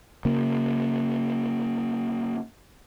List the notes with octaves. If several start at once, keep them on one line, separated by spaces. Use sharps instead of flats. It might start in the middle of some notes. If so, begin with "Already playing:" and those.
C#3 A#3